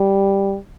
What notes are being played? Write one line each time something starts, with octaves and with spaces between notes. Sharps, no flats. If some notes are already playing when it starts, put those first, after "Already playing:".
Already playing: G3